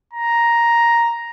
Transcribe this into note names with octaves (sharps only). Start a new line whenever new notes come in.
A#5